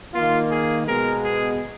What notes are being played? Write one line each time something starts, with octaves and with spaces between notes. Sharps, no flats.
D#3 A#3 F4
G#4
B2 G#3 B3 A#4
G#4